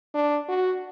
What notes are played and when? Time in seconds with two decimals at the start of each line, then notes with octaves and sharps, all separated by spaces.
0.14 D4
0.49 F#4